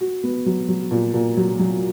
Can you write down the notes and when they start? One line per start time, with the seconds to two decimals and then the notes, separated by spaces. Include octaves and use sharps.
0.01 F#4
0.24 B3
0.46 F#3
0.69 F#3
0.91 A#2
1.14 A#2
1.37 F#3
1.59 F#3